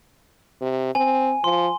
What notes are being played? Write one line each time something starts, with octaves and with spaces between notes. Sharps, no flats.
C3
C4 G#5
F3 C6